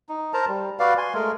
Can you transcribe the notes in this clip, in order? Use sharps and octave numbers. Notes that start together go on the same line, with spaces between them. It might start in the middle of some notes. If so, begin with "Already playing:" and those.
D#4
A#4 C5 A5 A#5
G3
F#4 B4 D5 F5
G#5 C6
G#3 A3 A#4